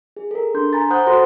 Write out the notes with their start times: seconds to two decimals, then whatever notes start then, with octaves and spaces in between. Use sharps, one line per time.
0.17 G#4
0.31 A4 A#4
0.54 D4 C6 G6
0.73 G#5 A#5 B5 A6
0.90 C5 F#5 D#6 F#6 G6
1.07 F#4 A4 C5 F#5 C6 A#6